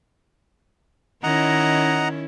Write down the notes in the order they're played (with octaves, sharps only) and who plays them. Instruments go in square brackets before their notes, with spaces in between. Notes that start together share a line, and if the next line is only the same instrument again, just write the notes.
[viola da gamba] D#3 C#4 E4 [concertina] D#5 F#5 A#5